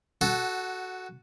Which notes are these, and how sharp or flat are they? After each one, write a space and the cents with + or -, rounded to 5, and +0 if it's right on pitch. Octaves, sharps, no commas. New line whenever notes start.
F#4 +0 A4 -10 F#5 +20